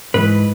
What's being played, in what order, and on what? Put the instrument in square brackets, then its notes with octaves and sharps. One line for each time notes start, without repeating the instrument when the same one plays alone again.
[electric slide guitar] G#2 E3 B4